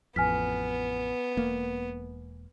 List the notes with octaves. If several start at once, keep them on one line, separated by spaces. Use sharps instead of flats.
A1 F2 B3 G#5 F6 B6
E1 A#3